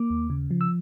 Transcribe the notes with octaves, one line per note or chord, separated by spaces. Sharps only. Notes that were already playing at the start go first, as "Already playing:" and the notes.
Already playing: A#3 D6
D#2
C#3
F3
E6